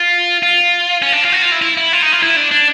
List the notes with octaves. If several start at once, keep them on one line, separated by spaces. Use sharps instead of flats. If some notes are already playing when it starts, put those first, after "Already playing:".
Already playing: F4
F4
C#4
D4
F4
F#4
F4
E4
E4
E4
F4
D#4
F4
E4
D4
D4